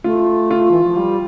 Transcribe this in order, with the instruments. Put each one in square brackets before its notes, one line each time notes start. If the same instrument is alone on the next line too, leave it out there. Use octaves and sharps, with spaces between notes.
[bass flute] A3 [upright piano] F4
[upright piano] F4
[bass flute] E3
F3
G3